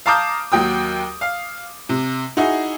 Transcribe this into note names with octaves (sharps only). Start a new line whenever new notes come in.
F5 A5 A#5 D6 D#6 G6
D#2 F#3 G5 D#6
F5
C3
D#4 E4 F#4 G#4